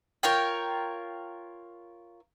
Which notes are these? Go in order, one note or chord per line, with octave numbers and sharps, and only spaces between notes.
F4 A#4 C#5 G5